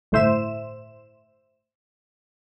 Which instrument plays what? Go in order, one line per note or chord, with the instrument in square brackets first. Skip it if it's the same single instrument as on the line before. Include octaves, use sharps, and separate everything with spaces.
[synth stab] G1 A2 C5 E5 E7